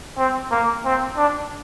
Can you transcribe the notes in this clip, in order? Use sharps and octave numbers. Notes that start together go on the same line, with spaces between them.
C4
A#3
C4
D4